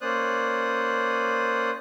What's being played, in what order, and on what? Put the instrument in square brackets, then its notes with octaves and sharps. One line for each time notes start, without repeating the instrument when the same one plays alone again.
[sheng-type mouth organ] A#3 C#4 C5 D5 D#6 F#6